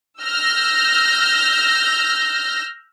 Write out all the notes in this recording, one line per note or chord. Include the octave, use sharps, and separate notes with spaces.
E6 F6 G6 A#6